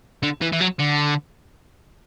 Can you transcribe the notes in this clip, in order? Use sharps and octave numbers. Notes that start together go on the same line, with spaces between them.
D3
E3
E3
F#3
D3